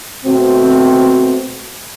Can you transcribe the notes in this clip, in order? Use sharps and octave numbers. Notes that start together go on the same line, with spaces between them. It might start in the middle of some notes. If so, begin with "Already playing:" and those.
B2 A3 C4 F#4 C5